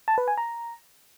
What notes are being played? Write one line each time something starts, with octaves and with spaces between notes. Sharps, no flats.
A5
B4
G#5
A#5